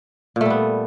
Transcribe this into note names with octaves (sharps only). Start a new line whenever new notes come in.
A#2 G3 A3 B3